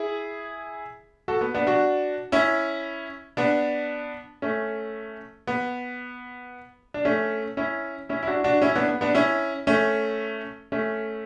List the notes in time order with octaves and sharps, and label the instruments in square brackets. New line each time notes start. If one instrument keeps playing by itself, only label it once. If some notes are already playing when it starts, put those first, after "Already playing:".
Already playing: [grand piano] E4 G#4
F#4 A4
B3
B3 D4
D4 F#4
C#4 E4
B3 D4
A3 C#4
B3
D4
A3 C#4
C#4 E4
C#4 E4
E4
D4 F#4
D4 F#4
C#4 E4
B3 D4
B3
B3 D4
C#4 E4
A3 C#4
A3 C#4